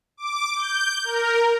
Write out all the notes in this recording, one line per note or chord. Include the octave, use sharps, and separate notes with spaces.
D6
G6
A#4